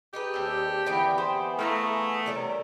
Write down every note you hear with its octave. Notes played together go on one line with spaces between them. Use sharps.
D#4 G4 G#4 B4
D#2 C4 A4 D5
D3 E3 B3 C4 G#4 G5 B5
G4 C5
A3 E4 F5 G5 A#5
C3 G3 C#4 A#4